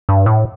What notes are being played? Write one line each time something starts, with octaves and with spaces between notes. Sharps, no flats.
G2
A2